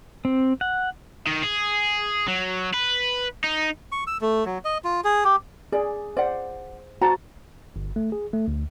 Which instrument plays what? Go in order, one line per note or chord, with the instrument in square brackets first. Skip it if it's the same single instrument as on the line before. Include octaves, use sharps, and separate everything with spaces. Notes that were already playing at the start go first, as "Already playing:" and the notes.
[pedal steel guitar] C4
F#5
[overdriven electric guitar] D#3
G#4
F#3
B4
D#4
[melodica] C#6
E6
A3
F#3
D#5
F4
G#4
G4
[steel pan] G#4 [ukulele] D5
[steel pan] C5 [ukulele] D5 F#5
[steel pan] F#4 C5 A5 [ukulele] A#5
[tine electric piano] G1
A3
G#4
A3
D2